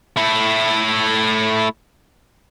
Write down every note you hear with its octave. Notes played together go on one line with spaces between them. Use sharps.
A3 E4